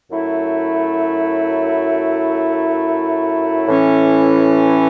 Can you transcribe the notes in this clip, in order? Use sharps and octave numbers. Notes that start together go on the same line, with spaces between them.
F#2 F#3 A3 E4
A2 E3 C#4